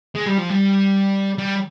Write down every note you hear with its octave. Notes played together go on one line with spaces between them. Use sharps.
G#3
G3
F3
G3
G3